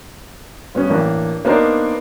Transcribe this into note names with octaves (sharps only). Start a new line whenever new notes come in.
G2 B3 C#4
A1 A#3 D4
A#3 B3 D4 D#4 A#4 C5